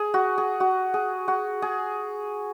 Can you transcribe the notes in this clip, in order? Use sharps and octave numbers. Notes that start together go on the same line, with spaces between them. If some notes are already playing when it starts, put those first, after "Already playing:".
Already playing: G#4
F#4
G#4
F#4
G#4
F#4
G#4